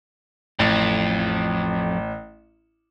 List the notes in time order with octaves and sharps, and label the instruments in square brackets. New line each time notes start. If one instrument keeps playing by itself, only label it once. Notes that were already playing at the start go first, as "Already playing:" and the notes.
[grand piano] A1 [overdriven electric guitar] F2